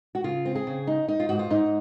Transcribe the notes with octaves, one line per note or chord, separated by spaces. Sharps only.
F#4
C#3 F4
C4
G#4
C#3
D#4
D#4
F4
G#2 F#4
F4
G#2 D#4